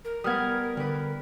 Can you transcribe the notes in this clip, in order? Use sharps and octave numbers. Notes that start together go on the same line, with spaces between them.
A#4
G3 B3 D#6 F6 G#6
D3 G3 B4